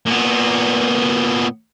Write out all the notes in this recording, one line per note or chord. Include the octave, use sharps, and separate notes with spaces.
A#2 B3